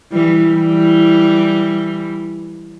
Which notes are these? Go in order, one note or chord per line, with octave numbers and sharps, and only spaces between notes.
E3 G3
E3 G3